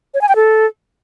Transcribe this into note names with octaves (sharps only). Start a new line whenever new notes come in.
C#5
G#5
G5
A4